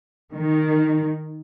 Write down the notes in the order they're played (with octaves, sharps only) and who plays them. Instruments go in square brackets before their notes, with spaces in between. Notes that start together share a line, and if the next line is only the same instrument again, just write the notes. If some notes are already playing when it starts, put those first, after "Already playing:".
[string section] D#3